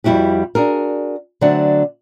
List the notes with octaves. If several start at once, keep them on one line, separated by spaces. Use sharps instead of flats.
F2 G3 E4 F#4 G4
D4 F#4 G#4 A#4
D3 F#3 A3 C4 D4 F#5